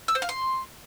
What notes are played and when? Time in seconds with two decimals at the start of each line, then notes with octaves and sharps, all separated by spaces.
0.08 E6
0.15 C5
0.22 F5
0.29 C6